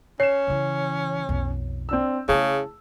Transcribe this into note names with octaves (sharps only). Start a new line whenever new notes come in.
C#4 C#5 C7 E7
C#3 E3
B1 F2
C4 D4 E6
C#3 A3 E4 G#4 A5